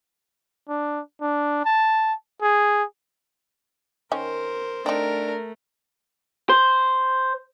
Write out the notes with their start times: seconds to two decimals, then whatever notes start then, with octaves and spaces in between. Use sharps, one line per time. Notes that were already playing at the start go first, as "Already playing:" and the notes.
0.69 D4
1.21 D4
1.65 A5
2.42 G#4
4.12 D#3 C#4 A#4 C5
4.86 A3 C4 D4 D#4 A#4
6.49 C5